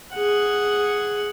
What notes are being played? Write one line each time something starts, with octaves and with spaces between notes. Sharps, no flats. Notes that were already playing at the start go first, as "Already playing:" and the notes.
G#4 F#5